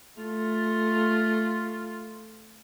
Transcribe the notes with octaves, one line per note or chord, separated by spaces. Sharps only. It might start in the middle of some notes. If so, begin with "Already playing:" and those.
A3 F4